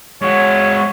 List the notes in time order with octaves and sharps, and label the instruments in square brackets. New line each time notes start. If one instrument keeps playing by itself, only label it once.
[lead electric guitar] G#3 F#4 [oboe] C#5